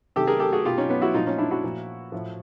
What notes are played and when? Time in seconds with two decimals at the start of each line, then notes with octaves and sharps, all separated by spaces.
0.16 C3 D#3 G4 A4
0.27 G#4 A#4
0.40 G4 A4
0.53 F#4 G#4
0.65 B2 F4 G4
0.78 C#4 D#4
0.89 B3 C#4
1.02 E4 F#4
1.14 A#2 F3 D#4 F4
1.27 C#4 D#4
1.38 D4 E4
1.51 E4 F#4
1.64 A#2 F3
2.12 A2 F3